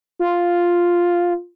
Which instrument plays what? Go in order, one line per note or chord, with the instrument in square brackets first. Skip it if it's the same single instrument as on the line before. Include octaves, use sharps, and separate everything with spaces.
[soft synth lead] F4